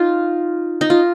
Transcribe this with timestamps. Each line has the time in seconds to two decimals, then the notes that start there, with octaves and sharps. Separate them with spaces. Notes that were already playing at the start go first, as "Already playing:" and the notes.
Already playing: D#4 F4
0.81 D#4
0.90 F4